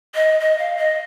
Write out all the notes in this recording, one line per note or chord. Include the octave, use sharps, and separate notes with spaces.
D#5
D#5
F5
D#5